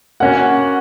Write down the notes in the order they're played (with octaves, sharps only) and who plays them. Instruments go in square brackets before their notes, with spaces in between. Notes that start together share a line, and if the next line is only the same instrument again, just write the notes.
[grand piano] A#3 C#4 F#4 [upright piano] F#5